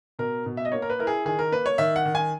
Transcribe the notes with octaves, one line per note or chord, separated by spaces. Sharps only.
B2 A#4
B2
E5
D#5
A#3 C#5
A#4
B4
E4 A#4
G#4
D#3 G#4
A#4
A#3 B4
C#5
D#3 E5
F#5
D#3
G#5